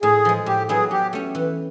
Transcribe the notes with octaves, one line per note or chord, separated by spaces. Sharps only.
A2 G#4
F3 G#3
A2 G4
F#3 B3 E4 G#4
F#3 G4
A3 C#4
E3